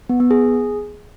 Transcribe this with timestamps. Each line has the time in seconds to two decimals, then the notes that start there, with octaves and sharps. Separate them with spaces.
0.09 B3
0.20 B3
0.31 G#4